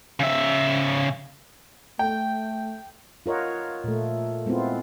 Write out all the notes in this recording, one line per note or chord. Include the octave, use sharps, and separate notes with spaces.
C#3 E5
A3 G5
F4 A#4 C#5 D#5 F#5
A#2 A3
G#3 B3 C4 E4 F4